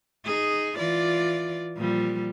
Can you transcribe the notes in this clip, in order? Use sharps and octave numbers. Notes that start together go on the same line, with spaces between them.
D#4 G#4
E3 F4 D5
A#2 F3 G3